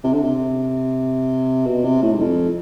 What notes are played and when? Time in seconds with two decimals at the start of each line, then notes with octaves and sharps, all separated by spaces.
0.04 C3
0.13 D3
0.23 C3
1.66 B2
1.84 C3
2.02 A2
2.13 G#2
2.20 F2